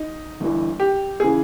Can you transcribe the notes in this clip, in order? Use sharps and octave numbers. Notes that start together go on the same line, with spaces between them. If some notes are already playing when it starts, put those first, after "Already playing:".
Already playing: D#4
G1 G2 E3
G4
C#3 E3 G#4